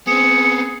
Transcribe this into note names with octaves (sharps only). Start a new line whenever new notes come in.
B3 C4 G#4 C#7